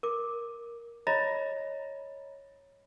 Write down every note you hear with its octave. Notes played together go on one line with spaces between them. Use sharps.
A#4 D6
C#5 D#5 A#5 B5 A6 A#6